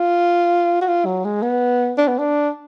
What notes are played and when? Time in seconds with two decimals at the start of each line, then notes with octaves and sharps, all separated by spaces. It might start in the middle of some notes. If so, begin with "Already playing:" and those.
Already playing: F4
0.81 F#4
0.88 F4
1.06 F#3
1.25 G#3
1.42 B3
1.98 D4
2.08 B3
2.19 D4